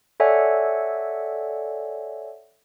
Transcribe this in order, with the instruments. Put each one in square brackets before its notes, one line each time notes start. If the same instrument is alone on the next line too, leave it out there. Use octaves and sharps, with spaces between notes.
[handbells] A4 C#5 D5 E5 F#5 G#5